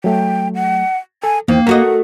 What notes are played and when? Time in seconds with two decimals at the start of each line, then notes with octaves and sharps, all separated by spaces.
0.04 F#3 A3 G5
0.55 F#5
1.24 A4 G#5
1.48 E2 D#3 A#3 C5
1.67 A3 F#4 A#4 D#5 F#5